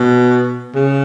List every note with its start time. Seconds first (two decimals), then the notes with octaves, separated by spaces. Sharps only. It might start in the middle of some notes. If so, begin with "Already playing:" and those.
Already playing: B2
0.75 C#3